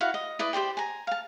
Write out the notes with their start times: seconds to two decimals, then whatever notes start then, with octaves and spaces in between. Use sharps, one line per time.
0.01 E4 F#4 F5 F#5
0.14 D#5
0.39 E4 B4 D5 D#5
0.53 G4 C5 D5 G5
0.77 G#5 A#5
1.07 F5 A5